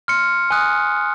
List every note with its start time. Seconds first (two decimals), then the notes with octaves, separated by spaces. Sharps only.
0.08 C6 F6 C#7
0.50 G#5 D#6 F#6